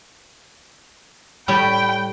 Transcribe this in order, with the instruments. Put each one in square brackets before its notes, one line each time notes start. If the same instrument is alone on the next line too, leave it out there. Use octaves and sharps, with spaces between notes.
[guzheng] A2 G3 [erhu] G5 [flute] B5